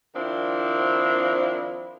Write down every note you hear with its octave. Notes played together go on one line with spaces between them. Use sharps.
D#3 F3 C4 D4 E4